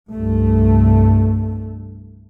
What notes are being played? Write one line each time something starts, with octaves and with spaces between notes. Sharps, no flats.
C2 G2 A3